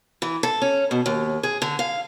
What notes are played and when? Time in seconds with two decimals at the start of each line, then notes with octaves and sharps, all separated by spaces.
0.22 E3
0.43 A4
0.62 C#4
0.91 B2
1.06 D#2
1.43 G#4
1.62 D3
1.79 F5